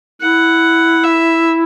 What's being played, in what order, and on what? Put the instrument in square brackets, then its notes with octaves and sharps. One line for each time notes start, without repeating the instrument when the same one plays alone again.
[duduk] E4 [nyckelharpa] F#5
[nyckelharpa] E5